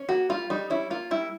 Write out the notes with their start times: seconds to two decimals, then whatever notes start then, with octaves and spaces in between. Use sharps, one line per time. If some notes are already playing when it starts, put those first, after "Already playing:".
Already playing: C#4
0.09 A#3 F#4
0.30 G3 F4
0.50 G3 D#4
0.70 C#4 E4
0.90 A#3 F4
1.11 G3 E4